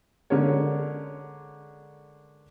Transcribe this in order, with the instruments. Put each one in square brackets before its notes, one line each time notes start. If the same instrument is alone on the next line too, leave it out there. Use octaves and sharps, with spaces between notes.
[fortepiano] D3 G#3 C#4 A#4 C#5